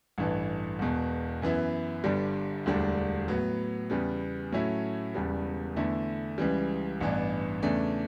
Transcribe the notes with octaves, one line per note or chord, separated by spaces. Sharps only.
A1 G2 E3 A3
E1 E2 B2
F#2 E3 B3 E4
G1 G2 D3 G3 D4
E1 D2 D3 G3 D4
A2 F#3 B3
E2 C#3 G3 B3
A2 F#3 A3 C#4 E4
E1 E2 C#3 G3 B3
E2 D3 A3 E4
C#2 C#3 E3 G3
A1 G2 E3 B3 D4
E2 C#3 E3 A3 D4